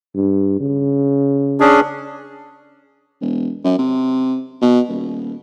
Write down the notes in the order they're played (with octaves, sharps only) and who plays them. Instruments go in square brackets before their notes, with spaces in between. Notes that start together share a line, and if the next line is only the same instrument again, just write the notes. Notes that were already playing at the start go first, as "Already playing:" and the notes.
[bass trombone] G2
C#3
[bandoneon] C#4 D4 G#4
[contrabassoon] E1
F#2
C3
B2
D#1